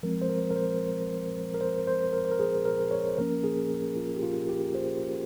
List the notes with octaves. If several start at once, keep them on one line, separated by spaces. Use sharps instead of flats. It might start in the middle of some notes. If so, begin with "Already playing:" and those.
F3 G#3 C4 A#4
C5
A#4
A#4
C5
A#4
C5
C5
A#4
C5
A#4
G#4
A#4
C#5
C5
F3 A#3 C#4 A#4
G#4
F4
G4
F4
G4
C5